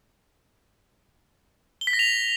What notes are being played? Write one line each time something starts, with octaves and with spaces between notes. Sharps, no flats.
G7
B6
A#6
F7